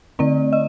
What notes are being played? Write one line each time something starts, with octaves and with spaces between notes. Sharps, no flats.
D3 A3 C4 D5
D#5